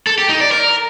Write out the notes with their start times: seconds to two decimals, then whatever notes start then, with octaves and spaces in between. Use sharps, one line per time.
0.07 A4
0.18 G4
0.29 D#4
0.40 D5
0.52 A#4